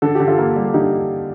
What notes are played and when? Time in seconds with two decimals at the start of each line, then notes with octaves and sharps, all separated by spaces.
0.02 D3 A4
0.15 D3 G4
0.27 F4 A4
0.38 A#3
0.56 G3
0.63 A4
0.74 D3 D#4 G4